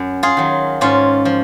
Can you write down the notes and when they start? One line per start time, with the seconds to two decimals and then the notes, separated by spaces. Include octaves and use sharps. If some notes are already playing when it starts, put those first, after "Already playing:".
Already playing: F#2
0.23 F4 G#4
0.37 D#3 F#3
0.81 G#2 C#4 F4
1.25 F3